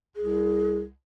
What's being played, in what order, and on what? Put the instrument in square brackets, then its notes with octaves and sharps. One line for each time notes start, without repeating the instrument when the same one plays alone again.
[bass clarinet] C2 [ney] G#4